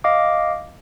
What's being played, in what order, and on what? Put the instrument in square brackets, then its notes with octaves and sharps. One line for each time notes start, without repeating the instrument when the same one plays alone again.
[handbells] D#5 F5 D6